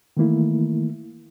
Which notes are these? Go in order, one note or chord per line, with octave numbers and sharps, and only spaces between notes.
D#3 E3 A3 A#3 E4